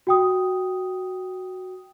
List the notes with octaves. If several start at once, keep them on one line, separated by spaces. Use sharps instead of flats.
F#4 G5 D#6